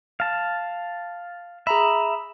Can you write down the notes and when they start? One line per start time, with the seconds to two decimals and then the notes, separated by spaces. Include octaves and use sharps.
0.20 F5 A5
1.67 G#4 E5 A#5 B5